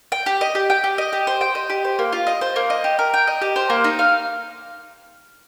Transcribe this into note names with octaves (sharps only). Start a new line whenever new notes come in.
G5
G4
D#5
G4
G5
G4
D#5
G4
C5
G5
D#5
G4
C5
A#3
F4
D#5
C5
A#3
D#5
G4
A#4
G5
D#5
G4
C5
A#3
D#4
F5